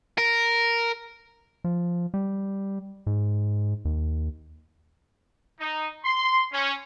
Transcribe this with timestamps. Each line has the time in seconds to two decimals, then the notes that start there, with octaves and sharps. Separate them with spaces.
0.18 A#4
1.64 F3
2.14 G3
3.07 G#2
3.85 D#2
5.60 D#4
6.04 C6
6.52 C#4